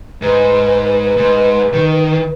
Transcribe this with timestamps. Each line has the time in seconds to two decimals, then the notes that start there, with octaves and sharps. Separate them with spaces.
0.22 G#2 B4
1.17 G#2
1.74 D#3